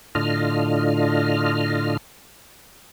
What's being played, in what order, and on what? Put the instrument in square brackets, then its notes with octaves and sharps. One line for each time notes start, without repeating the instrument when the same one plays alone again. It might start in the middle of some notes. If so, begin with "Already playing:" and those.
[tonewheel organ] A2 D3 D4 F4 D#5 F6